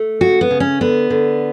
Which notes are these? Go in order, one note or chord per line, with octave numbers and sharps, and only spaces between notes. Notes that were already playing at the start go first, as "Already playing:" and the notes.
Already playing: A3
C#3 F#4
B3
C#3
C#4
D3 B3
D3